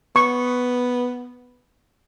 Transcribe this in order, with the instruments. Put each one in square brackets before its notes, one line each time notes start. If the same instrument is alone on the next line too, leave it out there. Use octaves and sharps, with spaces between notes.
[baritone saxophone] B3 [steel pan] C#6